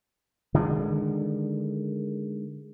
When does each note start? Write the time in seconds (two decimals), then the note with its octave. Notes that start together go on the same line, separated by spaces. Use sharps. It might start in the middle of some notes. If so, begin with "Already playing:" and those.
0.54 D3 D#3 G#3